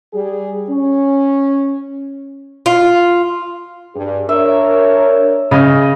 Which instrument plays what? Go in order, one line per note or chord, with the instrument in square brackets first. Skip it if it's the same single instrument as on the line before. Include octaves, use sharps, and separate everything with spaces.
[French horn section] G3 G#4
C#4
[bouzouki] F4
[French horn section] G2 G#4
[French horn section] D4 A#4 C#5 [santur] E5
[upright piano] C#3 [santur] G#4 D#5